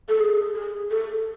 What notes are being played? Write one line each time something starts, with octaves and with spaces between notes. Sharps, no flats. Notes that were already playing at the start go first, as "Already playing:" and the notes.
A4
G#4
G#4
A4